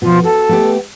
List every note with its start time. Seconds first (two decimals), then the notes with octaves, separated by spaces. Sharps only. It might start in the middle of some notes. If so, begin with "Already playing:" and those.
0.02 B2 F3 F4
0.24 F#4 A4
0.49 A3 B3 G4